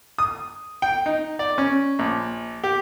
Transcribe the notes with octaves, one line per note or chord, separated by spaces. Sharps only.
D#6
G5
D#4
D5
C#4
A#1
G4